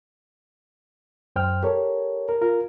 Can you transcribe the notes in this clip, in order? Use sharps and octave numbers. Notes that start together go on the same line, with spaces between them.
F#2 C5 G5 F6
G4 A4 A#4 C#5
A#4
F4 A#4